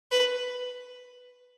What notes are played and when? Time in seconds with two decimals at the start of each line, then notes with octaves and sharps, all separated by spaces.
0.11 B4